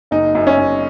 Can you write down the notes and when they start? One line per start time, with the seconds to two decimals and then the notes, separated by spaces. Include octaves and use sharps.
0.11 F#1 D#4
0.35 F#2
0.47 C#4
0.58 F#2